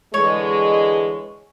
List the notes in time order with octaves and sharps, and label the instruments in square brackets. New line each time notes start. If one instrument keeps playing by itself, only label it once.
[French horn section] D3 E3 G#3 [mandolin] C#5